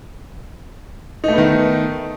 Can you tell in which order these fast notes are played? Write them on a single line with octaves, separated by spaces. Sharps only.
D#4 A3 B3 D#3